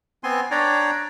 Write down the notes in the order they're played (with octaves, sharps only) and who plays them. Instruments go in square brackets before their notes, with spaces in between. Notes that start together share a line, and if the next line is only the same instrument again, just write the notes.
[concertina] B3 C4 G#5 C6
D4 C#5 D5 G5 A#5